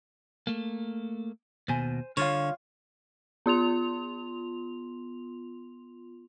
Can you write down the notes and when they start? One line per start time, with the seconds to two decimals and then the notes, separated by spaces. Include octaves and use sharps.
0.47 A3 A#3
1.68 D#2 B2 C5 G#5
2.17 D3 G3 F4 C#5 F5
3.46 B3 F4 C6 F7